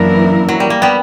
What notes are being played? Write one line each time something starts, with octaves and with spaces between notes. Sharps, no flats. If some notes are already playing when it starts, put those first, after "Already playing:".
Already playing: F#2 E3 A#3 B3 D4 E4 A#4
F#3
G3
A#3
G3 B3